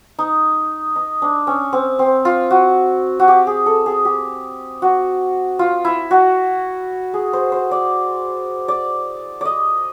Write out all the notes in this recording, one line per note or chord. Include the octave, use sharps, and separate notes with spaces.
D#4
D#4
D4
C#4
C4
C4
F4
F#4
F#4
G4
G#4
A4
G#4
G4
F#4
F4
E4
F#4
G#4
C5
C5
D5
D5
D5 D#5